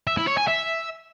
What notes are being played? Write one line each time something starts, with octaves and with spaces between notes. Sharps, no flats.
E5
E4
C#5
G#5
E5